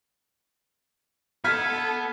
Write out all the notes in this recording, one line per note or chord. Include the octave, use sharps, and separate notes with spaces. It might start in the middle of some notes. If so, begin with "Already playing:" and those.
B3 A4 F6 G#6 B6